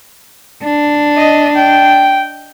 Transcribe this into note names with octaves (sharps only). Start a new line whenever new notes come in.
D4
D#5
G5